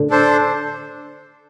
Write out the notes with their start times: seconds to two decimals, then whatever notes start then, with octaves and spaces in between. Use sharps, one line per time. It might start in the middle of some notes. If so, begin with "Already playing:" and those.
Already playing: A2 D3
0.10 D4 A4 C5